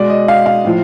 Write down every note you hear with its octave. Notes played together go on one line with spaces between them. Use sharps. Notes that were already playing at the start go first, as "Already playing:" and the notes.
Already playing: B2 G#3 D5
D#5
F5
F5
A2 F3